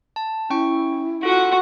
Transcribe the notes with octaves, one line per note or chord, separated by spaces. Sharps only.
A5
C#4 E4 G5 C#6
F4 F#4 A4 F#5